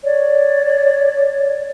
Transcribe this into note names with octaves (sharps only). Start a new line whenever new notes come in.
C#5 D5